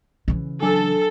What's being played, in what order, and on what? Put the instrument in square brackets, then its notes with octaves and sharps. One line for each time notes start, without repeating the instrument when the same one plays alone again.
[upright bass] C#3 E3
[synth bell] F#3 D4 G#5 [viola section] A4